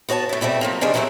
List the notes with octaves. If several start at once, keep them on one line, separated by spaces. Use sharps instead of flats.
B3 F#4 C#5 G#5 A5
A2 E4
B2 G3 A3 C4
F3 F#3 A#3
D#2 C#3 G#3 D4 G#5
C3 E3 F#3 A3 E4 A#4